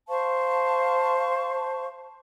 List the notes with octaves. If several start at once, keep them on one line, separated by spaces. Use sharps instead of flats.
C5 F5 A5 C#6